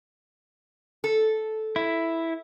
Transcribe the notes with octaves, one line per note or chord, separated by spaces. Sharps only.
A4
E4